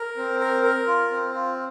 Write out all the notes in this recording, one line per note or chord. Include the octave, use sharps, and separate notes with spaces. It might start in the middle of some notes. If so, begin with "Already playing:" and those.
Already playing: A#4
C4
A#4
A#4
F4
C4
F4